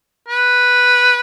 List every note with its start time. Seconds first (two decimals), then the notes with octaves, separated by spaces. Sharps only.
0.28 B4